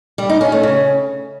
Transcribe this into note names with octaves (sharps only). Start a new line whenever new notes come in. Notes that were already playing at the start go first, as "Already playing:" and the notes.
G3
D#4
C#4
A3
C#3